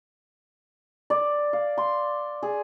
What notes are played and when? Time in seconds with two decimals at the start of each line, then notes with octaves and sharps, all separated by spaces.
1.10 D5
1.53 F5
1.78 C6
2.43 G#4